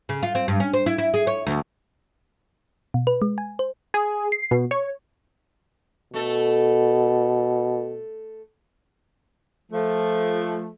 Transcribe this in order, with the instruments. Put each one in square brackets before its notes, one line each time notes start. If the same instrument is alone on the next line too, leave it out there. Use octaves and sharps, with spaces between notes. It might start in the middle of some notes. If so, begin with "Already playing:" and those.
[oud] C#3
F4
C4
G2
C#4
C5
E4
E4
G#4
C#5
D2
[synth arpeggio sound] B2
B4
G#3
G#5
C5
G#4
C7
B2
C#5
[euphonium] B2 [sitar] A3 A4
[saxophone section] F3 A3